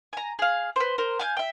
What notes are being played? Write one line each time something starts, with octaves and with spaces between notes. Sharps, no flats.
G#5 A#5
G#4 F5
B4 C5
A#4 C5
F5 G#5 G6
E5 G5